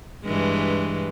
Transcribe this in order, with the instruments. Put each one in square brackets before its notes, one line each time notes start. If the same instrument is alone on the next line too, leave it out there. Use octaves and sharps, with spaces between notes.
[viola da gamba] G2 E3 G#3